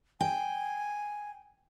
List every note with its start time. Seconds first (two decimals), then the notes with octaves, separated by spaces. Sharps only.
0.21 G5 G#5